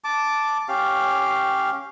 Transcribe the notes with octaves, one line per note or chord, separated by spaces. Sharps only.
A5 D6
C#4 G4 F5